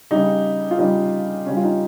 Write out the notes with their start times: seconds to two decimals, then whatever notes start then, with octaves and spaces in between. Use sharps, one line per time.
0.11 C#3 G3 D#4
0.71 F4
0.79 C#3 G3 D#4
1.46 C#3 G3 C#4
1.56 F4
1.63 D#4